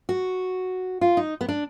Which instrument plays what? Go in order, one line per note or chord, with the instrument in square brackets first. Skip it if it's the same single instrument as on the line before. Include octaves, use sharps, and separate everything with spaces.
[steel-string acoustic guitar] F#4
F4
D#4
B3
D4